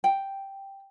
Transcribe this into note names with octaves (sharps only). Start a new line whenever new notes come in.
G5